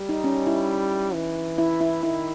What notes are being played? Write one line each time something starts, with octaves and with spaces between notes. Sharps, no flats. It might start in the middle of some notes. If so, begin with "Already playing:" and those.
Already playing: G3
D#4
C#4
E4
E3
E4
E4
D#3 E4